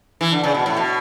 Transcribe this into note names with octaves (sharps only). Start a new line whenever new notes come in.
E3
D3
C#3
B2
A2
B2